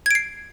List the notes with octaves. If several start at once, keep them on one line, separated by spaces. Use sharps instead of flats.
G#6 C7 D7